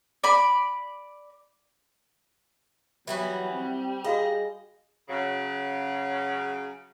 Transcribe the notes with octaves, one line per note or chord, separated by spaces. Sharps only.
D5 B5
E3 F#3 G3 B3 F#4
C4
F#4 G#4 D#5 F5 B5
C#3 F#3